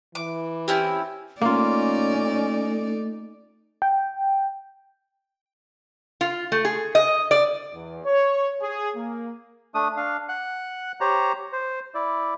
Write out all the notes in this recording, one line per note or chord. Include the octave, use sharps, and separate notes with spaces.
E3 D6
C4 C#4 E4 G4
A3 A#3 C#4 D#4 F4 D5
G5
F4
A3
G#4
D#5
D5
E2
C#5
G#4
A#3
A3 D4 D#6
D4 F5
F#5 F#6
G4 C5 C#5 A#5
C5
E4 D5